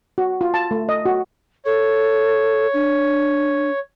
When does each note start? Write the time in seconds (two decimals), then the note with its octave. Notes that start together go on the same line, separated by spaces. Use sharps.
0.18 F#4
0.41 F4
0.54 A5
0.71 A3
0.89 D#5
1.05 F#4
1.65 A4 C#5
2.74 D4